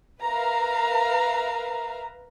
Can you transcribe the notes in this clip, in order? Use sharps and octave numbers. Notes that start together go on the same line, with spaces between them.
A#4 B4 E5 F5 A#5